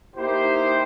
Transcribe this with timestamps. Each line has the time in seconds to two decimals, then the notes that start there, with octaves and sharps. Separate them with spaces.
0.16 A#3 D#4 E4 G4 C5